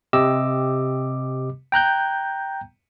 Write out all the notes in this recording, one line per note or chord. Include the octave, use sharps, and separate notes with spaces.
C3 G4 D#5 D6 E6
G5 A#5 F#6 G6